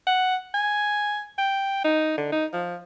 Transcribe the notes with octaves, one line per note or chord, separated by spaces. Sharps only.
F#5
G#5
G5
D#4
D3
D#4
F3